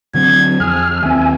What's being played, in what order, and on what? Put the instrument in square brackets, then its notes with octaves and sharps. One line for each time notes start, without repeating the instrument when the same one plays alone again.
[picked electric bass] D3 F#3 C4 [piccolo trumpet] G#6
[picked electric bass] F2 [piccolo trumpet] G#4 [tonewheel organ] F6
[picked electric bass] D#2 C4 [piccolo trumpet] E5 [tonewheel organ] G#5